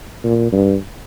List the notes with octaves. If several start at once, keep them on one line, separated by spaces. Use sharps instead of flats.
A#2
G2